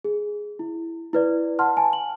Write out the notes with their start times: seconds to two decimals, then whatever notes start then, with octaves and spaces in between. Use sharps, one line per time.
0.04 G#4
0.59 E4
1.13 E4 B4 D5
1.59 F#5 A5 C6 F6
1.77 G#5 A5
1.93 F#7